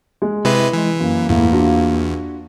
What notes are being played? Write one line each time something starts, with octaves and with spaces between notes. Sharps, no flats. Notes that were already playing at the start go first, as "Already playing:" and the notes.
G#3
C3 G#3 E4 B4
E3 G#3
F#2 A#3
E2 A2 A#3
D4 F4 F#4